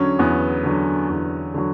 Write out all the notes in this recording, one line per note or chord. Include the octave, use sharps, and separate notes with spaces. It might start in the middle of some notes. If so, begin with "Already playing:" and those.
Already playing: E2 D3 F#3 C#4
E2 B3
D3 F#3
E2
D3 F#3